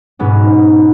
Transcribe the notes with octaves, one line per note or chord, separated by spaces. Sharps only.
G#2 B2 G#3 B3 C#4